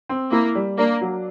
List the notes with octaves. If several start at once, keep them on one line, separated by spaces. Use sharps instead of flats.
C4
A#3 E4
G3
A#3 D4
F#3